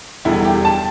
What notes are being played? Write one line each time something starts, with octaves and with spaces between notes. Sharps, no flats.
E1 E2 D3 G3 E4
G4
A5